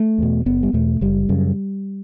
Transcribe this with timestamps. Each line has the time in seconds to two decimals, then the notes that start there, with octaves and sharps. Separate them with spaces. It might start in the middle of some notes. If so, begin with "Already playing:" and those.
Already playing: A3
0.18 E2 B2
0.46 F#1 B3
0.63 G3
0.73 E2 B2 A3
1.01 F#1 G3
1.29 F#2 C#3